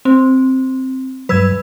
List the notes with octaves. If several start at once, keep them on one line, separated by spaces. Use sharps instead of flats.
C4
G2 F#3 B4 E6 G#6